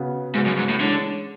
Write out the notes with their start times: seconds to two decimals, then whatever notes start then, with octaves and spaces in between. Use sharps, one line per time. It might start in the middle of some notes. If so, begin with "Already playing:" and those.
Already playing: C#3 B3 F#4
0.34 G#2 C#3 G#3 B3 F#4
0.46 F#2
0.58 G#2
0.69 A2
0.80 D3 E3 G#3 C#4